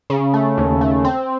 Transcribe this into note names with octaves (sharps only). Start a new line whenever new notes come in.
C#3
A3
D#2
A3
C4